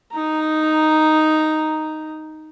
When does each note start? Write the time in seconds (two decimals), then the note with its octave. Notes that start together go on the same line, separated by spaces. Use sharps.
0.13 D#4 A#5